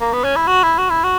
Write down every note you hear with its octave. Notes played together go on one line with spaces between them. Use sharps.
A#3
B3
C#4
E4
F#4
E4
F#4
E4
F#4